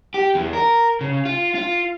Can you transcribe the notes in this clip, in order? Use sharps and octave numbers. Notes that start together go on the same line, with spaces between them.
G4
E2
A#4
C#3
F4
F4